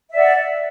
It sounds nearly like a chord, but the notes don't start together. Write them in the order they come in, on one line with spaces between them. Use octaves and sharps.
E5 D5 F#5